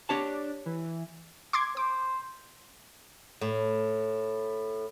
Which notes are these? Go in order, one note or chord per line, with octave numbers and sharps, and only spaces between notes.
D4 G4 C#5 A5
E3
C6 D6 G#6
C5 D6
A2